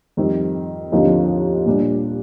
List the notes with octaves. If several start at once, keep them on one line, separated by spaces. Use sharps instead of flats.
F2 D#3 G3 C4
D#2 D3 F3 C4 D#4
A#2 G3 D4